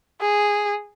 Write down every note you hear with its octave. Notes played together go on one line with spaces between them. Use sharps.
G#4